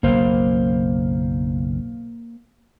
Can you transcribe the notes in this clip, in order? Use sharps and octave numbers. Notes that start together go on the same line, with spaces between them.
F#1 B1 A#3 C5 F5